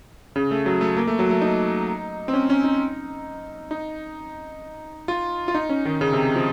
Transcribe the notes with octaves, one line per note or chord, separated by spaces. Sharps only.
C#3
A3
F#3
A3
A#3
A3
F#3
A3
D#4
C4
C#4
C#4
D#4
D#4
F4
F4
D#4
C#4
D#3
C#3
C3
F3